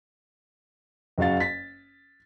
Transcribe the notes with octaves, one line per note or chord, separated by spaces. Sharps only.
F#1 F#2 F#4 F5 A6
A6 B6